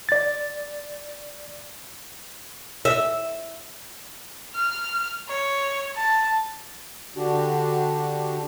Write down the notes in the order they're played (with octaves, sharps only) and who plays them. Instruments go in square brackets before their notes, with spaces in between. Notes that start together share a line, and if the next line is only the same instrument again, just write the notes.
[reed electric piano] D5 A6
[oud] E5
[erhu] F6
C#5
A5
[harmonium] D3 D4 F#4 G4